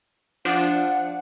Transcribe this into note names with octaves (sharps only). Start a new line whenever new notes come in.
F3 D4 F#5